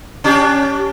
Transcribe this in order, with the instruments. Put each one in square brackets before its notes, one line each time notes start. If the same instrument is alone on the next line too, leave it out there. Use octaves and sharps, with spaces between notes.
[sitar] C#4 D4 G4